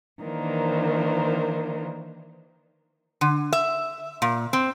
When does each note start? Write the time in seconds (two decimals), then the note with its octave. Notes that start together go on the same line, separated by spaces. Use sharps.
0.22 D#3 E3 A#3 D4 A#4 C5
3.21 D3
3.53 E5
4.22 A#2
4.53 C4